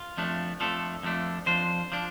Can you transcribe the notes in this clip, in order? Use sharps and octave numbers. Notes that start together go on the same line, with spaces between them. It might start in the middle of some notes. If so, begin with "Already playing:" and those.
Already playing: F4
F2 F3 A3 D4
F2 F3 A3 D4 A4
F2 F3 A3 D4
F2 F3 D4 C5
F3 D4